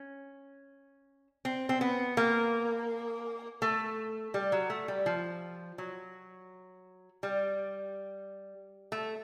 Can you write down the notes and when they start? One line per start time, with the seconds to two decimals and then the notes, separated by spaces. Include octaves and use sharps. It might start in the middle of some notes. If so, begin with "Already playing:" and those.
Already playing: C#4
1.45 C4
1.69 C4
1.81 B3
2.17 A#3
3.62 A3
4.34 G3
4.52 F#3
4.70 A3
4.88 G3
5.06 F3
5.78 F#3
7.23 G3
8.92 A3